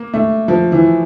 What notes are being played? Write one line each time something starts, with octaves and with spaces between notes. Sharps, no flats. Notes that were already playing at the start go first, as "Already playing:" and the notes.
Already playing: A#3
A3
F3
E3